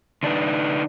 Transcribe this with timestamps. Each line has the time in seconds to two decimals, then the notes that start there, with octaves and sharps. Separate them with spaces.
0.23 D3 D4 D#4 B4